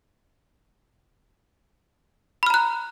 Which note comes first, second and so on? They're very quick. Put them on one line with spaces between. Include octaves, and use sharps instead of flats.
B5 F6 A#5 F#6